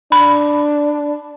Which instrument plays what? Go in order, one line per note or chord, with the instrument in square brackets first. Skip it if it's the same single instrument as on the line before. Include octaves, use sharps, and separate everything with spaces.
[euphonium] D4 [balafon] B5